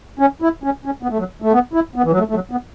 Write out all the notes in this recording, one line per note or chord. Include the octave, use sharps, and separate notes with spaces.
C#4
E4
C#4
C#4
B3
A3
F#3
A3
B3
E4
B3
E3
F#3
A3
A3
F#3
B3